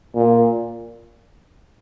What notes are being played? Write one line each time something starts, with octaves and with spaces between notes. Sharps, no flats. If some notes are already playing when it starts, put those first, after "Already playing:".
A#2